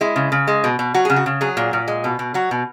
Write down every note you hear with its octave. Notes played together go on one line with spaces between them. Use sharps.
G#3 E4
C#3
C#3
G#3
B2
B2
F#3 F#4
C#3 G#4
F#4
C#3
F#3 G#4
A#2
A#2
G#3
B2
B2
F#3 F#4
B2